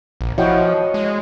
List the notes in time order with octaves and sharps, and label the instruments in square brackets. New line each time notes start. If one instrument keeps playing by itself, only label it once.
[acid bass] A#1
[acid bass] F3 [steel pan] E4 F#4 G5 [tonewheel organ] C#5 D#5
[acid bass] G#3